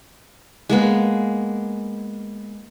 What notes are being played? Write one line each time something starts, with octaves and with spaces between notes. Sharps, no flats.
G#3 A#3 B3